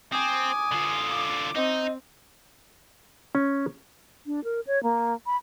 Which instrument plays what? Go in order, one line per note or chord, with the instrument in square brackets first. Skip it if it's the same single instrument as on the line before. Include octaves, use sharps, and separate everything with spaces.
[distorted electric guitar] C4 [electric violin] G#5 D6 [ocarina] D#6
[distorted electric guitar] D3 F4
[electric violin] D6
[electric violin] C4 [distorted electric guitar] D#4 [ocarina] D#5
[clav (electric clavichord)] C#4
[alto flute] D4
A#4
C#5
A#3
B5